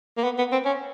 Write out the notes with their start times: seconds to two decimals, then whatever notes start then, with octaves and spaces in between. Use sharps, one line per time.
0.17 A#3
0.24 B3
0.38 B3
0.52 C4
0.65 C#4